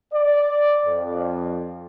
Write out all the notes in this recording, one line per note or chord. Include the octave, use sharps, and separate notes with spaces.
D5
F2